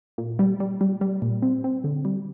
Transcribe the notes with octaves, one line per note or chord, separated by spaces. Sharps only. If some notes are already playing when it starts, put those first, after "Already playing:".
A#2
G3
G3
G3
G3
A#2
C4
C4
D3
G3